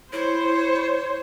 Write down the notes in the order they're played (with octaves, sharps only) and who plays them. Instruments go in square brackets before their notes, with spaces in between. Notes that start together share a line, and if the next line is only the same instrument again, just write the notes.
[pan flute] E4 [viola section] C5 [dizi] C#5